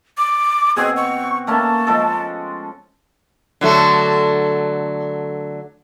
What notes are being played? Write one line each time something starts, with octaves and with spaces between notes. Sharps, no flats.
D6
B2 C4 F#4 G#4
C#6
A3 A#3 C#4 A5
F3 G#3 A4
D3 F#3 A3